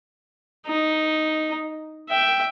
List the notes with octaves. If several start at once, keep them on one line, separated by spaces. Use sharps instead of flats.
D#4
E5 G5